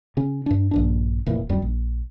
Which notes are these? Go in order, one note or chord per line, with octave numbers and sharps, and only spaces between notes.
C#3 C#4
G2 D4
A#1 G2 D4
F1 A#2 E3
D1 F#2 G3
A#1